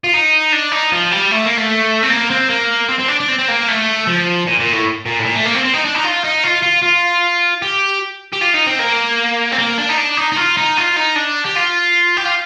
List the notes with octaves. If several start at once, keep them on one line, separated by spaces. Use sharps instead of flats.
F4
D#4
D4
D#4
F3
G3
A3
A#3
A3
C4
A#3
C4
A#3
C4
C4
D4
D4
C4
C4
A#3
A3
F3
A#2
A#2
A2
A#2
A2
A#2
A3
A#3
C4
C4
D#4
D4
D#4
F4
D#4
F4
F4
F4
G4
G4
F4
D#4
C4
A#3
C4
A#3
D4
D#4
D4
D#4
D#4
F4
D#4
F4
D#4
D4
G4
F4
G4
F4